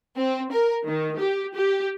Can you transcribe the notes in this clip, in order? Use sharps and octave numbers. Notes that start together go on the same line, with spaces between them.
C4
A#4
D#3
G4
G4